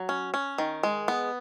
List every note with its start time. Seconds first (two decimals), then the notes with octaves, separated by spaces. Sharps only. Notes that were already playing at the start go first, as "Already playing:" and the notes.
Already playing: F#3
0.09 C#4
0.34 C#4
0.58 D#3
0.83 G#3
1.08 B3